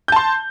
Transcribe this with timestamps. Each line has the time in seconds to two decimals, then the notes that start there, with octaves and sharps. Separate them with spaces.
0.08 G6
0.12 A5
0.16 C6